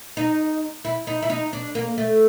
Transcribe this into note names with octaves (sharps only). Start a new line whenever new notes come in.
D#4
E4
D#4
E4
D#4
D4
A#3
A3